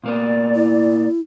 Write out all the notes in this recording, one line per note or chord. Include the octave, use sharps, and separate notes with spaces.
A#2 A#3 B3 D5
E4